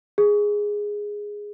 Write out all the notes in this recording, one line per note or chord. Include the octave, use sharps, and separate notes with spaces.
G#4